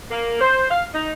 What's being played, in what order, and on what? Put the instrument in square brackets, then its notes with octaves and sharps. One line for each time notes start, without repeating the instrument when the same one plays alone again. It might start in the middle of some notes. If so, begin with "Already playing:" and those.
[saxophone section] A#3
C5
F5
D#4